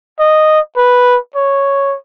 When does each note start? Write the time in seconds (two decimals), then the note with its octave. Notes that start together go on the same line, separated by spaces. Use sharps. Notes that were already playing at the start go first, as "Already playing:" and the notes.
0.19 D#5
0.77 B4
1.35 C#5